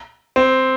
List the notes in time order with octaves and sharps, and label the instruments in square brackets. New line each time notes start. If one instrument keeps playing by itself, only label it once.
[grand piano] C4